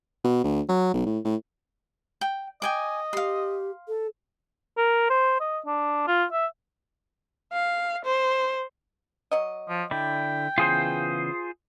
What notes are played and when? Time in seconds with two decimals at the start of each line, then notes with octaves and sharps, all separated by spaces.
0.24 B2
0.44 D2
0.69 F#3
0.94 B1
1.06 A2
1.25 A2
2.21 G5
2.62 D#5 G5 G#5 D6
3.13 G4 F5 C6
3.88 A4
4.77 A#4
5.10 C5
5.40 D#5
5.66 D4
6.08 F4
6.32 E5
7.53 F5
8.05 C5
9.31 F#3 D#5
9.69 F3
9.91 D3 E4 D5 G5
10.58 C#3 E3 B3 F4 G#4 C5